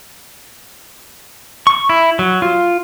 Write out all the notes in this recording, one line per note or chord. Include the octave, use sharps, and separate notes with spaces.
C#6
E4
F#3
F4